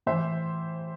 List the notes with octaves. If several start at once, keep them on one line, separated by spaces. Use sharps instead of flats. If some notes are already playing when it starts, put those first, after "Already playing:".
A2 E3 C5 E5